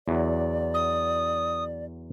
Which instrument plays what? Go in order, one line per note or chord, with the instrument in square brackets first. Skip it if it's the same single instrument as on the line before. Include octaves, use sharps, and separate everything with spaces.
[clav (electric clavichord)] E2 F#3 [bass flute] D5
[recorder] D#6